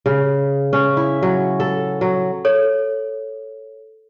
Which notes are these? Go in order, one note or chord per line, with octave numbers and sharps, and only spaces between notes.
C#3
C#4
E4
F#3
A4
F#3
A4 C#5